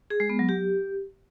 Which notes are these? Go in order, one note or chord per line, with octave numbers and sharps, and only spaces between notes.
G#4
G#3
B3
F#3
G4